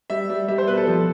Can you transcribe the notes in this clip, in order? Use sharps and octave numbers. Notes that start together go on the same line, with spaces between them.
G3 E5
G3
G3 E5
C5
B2 B4
A4
F3